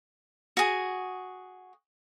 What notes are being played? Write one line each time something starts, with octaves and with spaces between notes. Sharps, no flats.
F#4 G#4